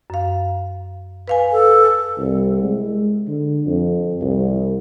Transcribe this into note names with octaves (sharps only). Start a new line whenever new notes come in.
F#2 F5
B4 F5 G#5
A4
C2
G#3
D3
F2
C2